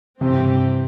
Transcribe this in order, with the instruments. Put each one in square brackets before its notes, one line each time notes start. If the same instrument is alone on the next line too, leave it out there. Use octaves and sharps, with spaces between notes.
[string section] G2 E3 C4 G4 [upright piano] C3